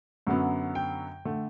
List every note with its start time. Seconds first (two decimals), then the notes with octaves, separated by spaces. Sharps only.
0.27 F#2 D3 F#3 B3
0.75 G5
1.25 D3 A3